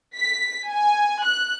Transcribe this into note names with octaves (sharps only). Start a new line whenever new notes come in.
B6
G#5
F#6